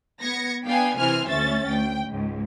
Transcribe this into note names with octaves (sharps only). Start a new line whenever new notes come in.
B3 G#6 A#6 C#7
B3 D4 F5 G5 G#5
C3 E3 C5 G#5 F6
D2 C#4 E5 A6
D2 G5
C#2 G#2